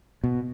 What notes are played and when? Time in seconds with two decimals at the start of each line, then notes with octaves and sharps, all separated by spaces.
0.24 B2